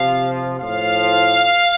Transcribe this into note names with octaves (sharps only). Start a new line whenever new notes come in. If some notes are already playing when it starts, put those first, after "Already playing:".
Already playing: C3 F3 F5
A2 F3 F5